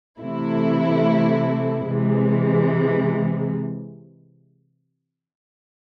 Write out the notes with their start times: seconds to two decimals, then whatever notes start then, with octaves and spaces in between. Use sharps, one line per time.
0.21 C3 E3 A3 E4
1.87 C3 E3 G#3